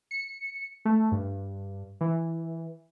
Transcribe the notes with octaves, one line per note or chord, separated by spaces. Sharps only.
C#7
A3
G2
E3